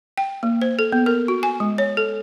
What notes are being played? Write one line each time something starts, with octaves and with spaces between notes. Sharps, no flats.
G5
A#3
C5
A4
B3
A#4
F#4
G#5
G#3
C#5
A4